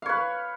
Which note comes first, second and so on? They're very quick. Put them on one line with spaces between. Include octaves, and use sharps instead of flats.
F5 C#5 B4